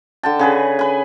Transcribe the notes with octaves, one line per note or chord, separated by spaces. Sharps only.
D3 G5 A5
C#3 G#4 B4
B4 G#5